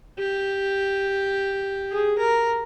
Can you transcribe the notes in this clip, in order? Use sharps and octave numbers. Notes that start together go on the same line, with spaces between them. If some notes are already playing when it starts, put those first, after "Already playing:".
G4
G#4
A#4